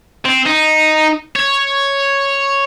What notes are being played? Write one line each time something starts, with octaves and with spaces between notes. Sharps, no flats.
C4
D#4
C#5